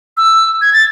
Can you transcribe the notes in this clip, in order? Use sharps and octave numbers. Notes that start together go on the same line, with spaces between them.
E6
G#6
A6